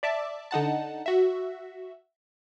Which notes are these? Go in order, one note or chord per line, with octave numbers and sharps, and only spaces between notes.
D5 E5 A5 D6
D3 D#4 F#5 A5
F#4 E5